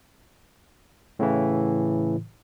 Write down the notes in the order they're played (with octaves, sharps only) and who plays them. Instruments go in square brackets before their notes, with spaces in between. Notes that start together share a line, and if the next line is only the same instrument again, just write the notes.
[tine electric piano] A2 C#3 E3